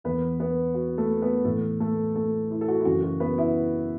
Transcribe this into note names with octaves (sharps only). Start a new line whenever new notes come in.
E2 E3 B3 B4
B3 B4
F#4
A3 A4
B3 B4
A2 E3 A3 A4
A3 A4
A3 A4
E4
A4
F#4
E4
F#2 C#3 E3 F#4
F#4
B3 B4
E4 E5